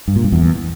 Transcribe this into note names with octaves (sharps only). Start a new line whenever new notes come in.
G2
A#2
G2
E2